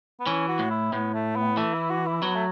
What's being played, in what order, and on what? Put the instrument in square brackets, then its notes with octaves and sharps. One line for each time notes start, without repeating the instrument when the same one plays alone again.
[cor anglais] B3
[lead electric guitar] E3 [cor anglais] C#4
[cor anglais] F#4
[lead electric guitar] A2
[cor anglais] E4
[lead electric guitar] A2 [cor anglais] B3
[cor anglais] A3
B3
[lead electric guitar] E3 [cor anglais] A3
[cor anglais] E4
F#4
E4
[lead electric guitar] F#3 [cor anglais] B3
[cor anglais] A3